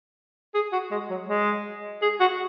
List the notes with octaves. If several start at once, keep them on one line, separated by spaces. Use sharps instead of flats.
G#4
F#4
G#3
F#3
G#3
G#4
F#4